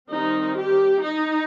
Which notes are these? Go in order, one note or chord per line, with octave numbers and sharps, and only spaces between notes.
D#3 G3 C4 D#4
G4
D#4